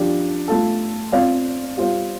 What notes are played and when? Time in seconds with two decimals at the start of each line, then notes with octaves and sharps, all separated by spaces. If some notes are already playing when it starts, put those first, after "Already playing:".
Already playing: F3 D4 G4
0.48 A3 F4 A4
1.12 C4 F4 D5 F5
1.77 G3 F4 C5 F5